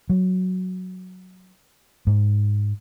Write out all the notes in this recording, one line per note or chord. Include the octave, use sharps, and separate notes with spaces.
F#3
G#2